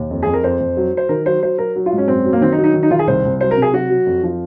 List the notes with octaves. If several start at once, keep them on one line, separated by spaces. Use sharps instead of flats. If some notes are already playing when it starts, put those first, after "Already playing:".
Already playing: D#2
F2
F2 G#4
A#4
F2 C5
F2
F#3
F#3
C5
D#3 A#4
F#3 C5
F#3 C5
F#3 A#4
F#3
F4
G#2
C#4
F#2 C4
F#3
A#3
D#3 C4
D#4
F#3
D#4
D#3
D#4
D#3 F4
G#4
C2 C5
C2
F#3 C5
A#4
C3 G#4
F#3 F#4
F#3
F2
F3